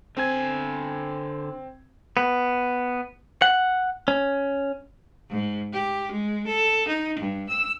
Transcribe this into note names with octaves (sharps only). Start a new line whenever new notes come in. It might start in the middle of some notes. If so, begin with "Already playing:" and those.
D3 C4 G#5 G#6
B3
F#5
C#4
G#2
G4
G#3
A4
D#4
G2
E6